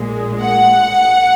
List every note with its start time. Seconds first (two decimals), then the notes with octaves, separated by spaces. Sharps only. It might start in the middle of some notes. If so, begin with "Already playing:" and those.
Already playing: A#1 A#2 G#3
0.41 F#5